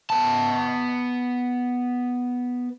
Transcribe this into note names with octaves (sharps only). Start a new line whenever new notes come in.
B3 A5